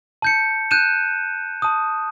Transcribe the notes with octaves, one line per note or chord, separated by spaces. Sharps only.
A5 G6 C#7
F#6 G6 D#7 E7
A5 D#6